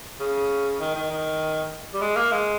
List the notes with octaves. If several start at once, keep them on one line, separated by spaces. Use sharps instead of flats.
C#3
D#3
D#3
D#3
G3
G#3
A#3
G#3